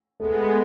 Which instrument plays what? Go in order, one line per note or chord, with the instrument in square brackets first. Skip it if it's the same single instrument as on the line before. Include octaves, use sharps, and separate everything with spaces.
[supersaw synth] G#3 B3 [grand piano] A3